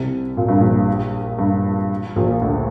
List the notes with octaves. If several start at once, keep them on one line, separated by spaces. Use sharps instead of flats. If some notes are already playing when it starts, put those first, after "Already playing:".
Already playing: C2 C3
A#2
G2
A#1 A#2
G2
A#1 A#2
D2 D3